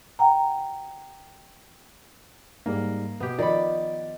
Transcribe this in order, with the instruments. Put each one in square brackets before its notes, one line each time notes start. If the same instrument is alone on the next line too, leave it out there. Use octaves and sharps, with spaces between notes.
[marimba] F#5 G5 A#5
[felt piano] G#2 G3 [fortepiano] A#3
[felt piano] B2 [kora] B3 G4
[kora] D#3 [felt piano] F3 [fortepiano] D5 B5